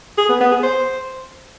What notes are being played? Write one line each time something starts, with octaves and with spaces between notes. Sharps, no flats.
G#4
B3
B3
G#4
C5